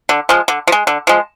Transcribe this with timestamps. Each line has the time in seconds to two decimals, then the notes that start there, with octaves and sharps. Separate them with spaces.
0.09 D3
0.29 F3 G#3
0.48 D3
0.67 F3
0.72 G#3
0.87 D3
1.07 F3 G#3